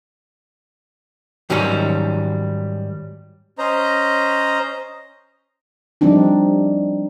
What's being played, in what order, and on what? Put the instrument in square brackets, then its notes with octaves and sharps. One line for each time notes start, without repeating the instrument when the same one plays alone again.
[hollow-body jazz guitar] G#2 D#3 F#3 G3 C#4
[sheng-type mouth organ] C#4 C5 D#5 A#5
[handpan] F3 G3 C4 D4 D#4